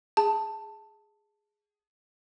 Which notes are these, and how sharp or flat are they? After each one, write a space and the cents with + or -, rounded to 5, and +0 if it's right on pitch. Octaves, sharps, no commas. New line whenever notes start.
G#4 +0 A5 +10